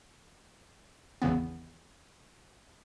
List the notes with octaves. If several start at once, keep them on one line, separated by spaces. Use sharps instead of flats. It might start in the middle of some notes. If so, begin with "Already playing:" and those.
G#1 E2 C#3 E3 B3